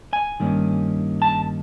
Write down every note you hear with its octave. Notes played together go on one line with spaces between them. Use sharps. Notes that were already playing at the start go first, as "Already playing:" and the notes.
G#5
G2 D#3 G3 A#3 C#4
A5